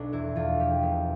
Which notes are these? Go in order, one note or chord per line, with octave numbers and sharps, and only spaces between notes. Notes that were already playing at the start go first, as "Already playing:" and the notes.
Already playing: B1 D4 A4
E2 E4
E2 F4
F3 G4
B2